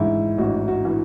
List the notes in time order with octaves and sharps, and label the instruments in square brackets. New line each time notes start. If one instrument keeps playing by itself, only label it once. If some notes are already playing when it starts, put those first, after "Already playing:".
Already playing: [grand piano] A1 G#2 E3 E4
A1 F#4
F#4
E3